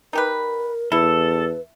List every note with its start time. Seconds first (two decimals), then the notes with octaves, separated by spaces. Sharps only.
0.13 D#4 G4 A#4 B4
0.92 E2 E4 A4 B4